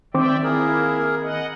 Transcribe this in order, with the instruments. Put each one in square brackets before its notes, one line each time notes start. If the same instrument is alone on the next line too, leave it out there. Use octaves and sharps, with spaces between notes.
[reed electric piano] D#3 C4 D6 [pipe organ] D5 E5 G5
[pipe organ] A#3 E4 [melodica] G#4 A#4
[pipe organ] D#5 F#5